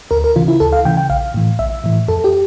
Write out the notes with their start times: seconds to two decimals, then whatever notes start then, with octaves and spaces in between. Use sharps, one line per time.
0.11 D2 A#4
0.24 A#4
0.36 C#3 E3 F4
0.48 E4
0.60 D2 A4
0.73 F5
0.85 C#3 E3 G5
0.97 G5
1.10 A#1 F5
1.34 A2 E3
1.59 A#1 E5
1.84 A2 E3
2.08 F2 A4
2.24 G4